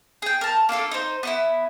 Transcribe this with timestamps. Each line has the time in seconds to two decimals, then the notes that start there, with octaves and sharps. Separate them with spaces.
0.22 G#4 G5
0.41 A#4 A5
0.69 A#3 D4 F4 A4
0.91 D#4 C5
1.23 B3 D#4 E4